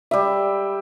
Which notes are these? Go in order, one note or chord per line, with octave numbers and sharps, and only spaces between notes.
G3 E5